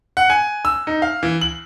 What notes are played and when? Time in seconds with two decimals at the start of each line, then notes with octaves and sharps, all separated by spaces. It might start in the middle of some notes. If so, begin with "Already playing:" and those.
0.17 F#5
0.30 G#5
0.65 E6
0.87 D#4
1.02 F5
1.23 E3
1.41 F#7